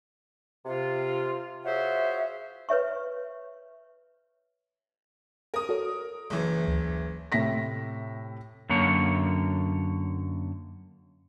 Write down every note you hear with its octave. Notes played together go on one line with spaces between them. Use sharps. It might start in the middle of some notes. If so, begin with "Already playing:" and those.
C3 F4
F4 F#4 G#4 C5 C#5 E5
B4 C#5 E5 C#6
A#4 D#6
F#4 A4 C#5
F#1 E3
D2
A2 C3 E5 A#6 B6
F#2 D3 A#3 C#5